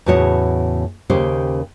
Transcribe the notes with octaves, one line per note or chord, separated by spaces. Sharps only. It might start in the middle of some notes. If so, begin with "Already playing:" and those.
E2 A2 C#3 F#4 C#5 A5
D#2 C#3 C#4 G4 C5